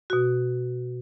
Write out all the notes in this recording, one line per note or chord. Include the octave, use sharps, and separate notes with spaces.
B2 F#4